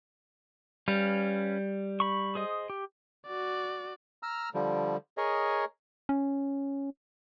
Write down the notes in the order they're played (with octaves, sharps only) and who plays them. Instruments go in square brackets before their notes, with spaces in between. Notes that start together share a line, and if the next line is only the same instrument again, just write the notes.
[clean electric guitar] G3 [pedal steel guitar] C#4 B4 F5
[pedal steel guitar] B5 C#6
G#4 C5 D#5
G4
[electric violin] F#4 D5
[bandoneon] A#5 E6 F6
D3 F3 G3
G#4 A#4 C#5 D#5
[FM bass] C#4